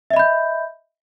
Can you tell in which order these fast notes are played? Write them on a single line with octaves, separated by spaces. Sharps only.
E5 D#5 B5 G6